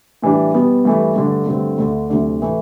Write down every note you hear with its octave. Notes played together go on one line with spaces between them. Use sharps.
A2 E3 G3 D4
B2 G3 B3
G2 E3 A3
G2 D3 A3 D4
G2 D3 A3 C4
D2 D3 A3 D4
D2 C3 F#3 A3 D4
A2 E3 A3